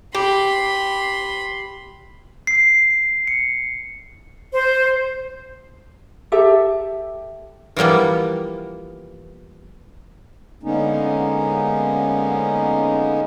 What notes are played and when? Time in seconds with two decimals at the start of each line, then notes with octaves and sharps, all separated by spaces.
0.15 G4 B5 C6
2.47 C7
3.27 C#7
4.53 C5
6.32 G4 A4 E5
7.77 E3 F3 G3 A#3 B3
10.63 D3 G#3 A#3 B3 C#4 D#4